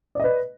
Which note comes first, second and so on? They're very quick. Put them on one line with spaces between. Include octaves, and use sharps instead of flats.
D5 D#5 B4